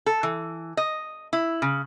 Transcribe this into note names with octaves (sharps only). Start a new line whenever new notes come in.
A4
E3
D#5
E4
C#3